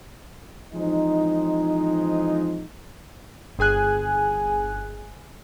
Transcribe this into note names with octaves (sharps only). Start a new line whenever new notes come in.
E3 F3 G#3 C4 D#4
G1 G#4 G#5 F#6